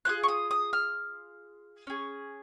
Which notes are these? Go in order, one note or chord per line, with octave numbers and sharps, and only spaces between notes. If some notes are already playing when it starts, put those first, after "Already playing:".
B3 F4 G#4 F#6
C#6
D#6
D#6
F6
C#4 G#4